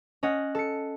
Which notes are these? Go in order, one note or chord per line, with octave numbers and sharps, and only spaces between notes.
C#4 D#5 F#5
A4 C#7